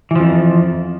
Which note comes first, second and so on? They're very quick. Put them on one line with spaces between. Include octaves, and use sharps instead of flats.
E3 F3 F2